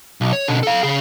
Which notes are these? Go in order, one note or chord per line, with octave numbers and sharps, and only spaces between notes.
B1
C#5
B2 D3
A4 F5
C#3 G#4